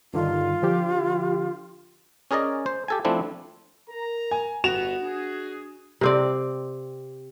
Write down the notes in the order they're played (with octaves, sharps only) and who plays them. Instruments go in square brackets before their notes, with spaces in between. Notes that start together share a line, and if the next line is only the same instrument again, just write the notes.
[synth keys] G2 D3 D#3 [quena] F4
[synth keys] D3 F3 G4
[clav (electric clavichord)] C#4 G#4 A#4 D5 D#5
C5
G4 A4 G#5
F3 A3 C4 D4 E4
[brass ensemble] A#4 A#5
[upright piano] G#5
[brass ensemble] G1 B3 [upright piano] F#4 E7 F7
[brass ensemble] D4 G#4
[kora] C3 C4 D5